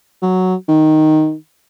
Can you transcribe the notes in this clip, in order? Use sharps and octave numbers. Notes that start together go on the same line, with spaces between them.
F#3
D#3